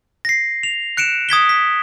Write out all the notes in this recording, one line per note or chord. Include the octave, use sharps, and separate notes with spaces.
A#6 C7
F7
F#6 C#7 D7 E7
D#6 G#6 B6 G7
B6